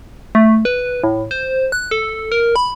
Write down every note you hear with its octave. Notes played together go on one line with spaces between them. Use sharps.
A3
B4
A2
C5
F#6
A4
A#4
B5